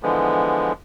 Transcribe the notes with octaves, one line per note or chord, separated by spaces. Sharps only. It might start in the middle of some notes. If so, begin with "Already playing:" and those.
D3 E3 F3 G#3 B3